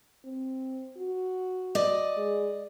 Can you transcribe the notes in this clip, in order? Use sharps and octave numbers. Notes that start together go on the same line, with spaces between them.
C4
F#4
D5 D#5
G#3